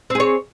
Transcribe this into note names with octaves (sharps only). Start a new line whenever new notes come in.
C4 G#4 C#5